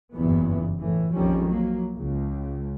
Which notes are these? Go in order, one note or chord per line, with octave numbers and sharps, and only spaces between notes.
F#1 E2 G2 A#2 E3 B3
A2 E3
A#1 F2 D#3 F3 G3 C#4
F#3 A#3
C#2